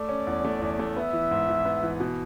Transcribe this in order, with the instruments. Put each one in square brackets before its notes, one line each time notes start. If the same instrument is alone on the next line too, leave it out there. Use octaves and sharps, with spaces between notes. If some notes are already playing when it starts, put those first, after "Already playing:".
Already playing: [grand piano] A3 [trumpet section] D5
[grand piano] C#4
E2
A3
E2
A3
[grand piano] B3 [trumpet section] E5
[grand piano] E3
G#2
E3
B3
E3
B2